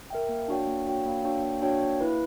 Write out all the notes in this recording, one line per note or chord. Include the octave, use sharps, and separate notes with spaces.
A#4 E5 G5
A#3
D4 F#4 C#5 G5
A#3
D4 F#4 C#5 G5
A#3
D4 F#4 C#5 G5
A#3
D4 F#4 C#5 G5
A#3
E4 B4